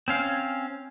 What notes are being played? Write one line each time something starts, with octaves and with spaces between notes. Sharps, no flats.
C4 C#4 F5